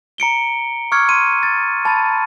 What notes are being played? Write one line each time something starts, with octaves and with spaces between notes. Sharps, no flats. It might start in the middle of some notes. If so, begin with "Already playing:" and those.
A#5 C#7 D7 G7
C#6 D6 E6 F6 G#6 C#7
C6 D#7
A6
A5 B5 A6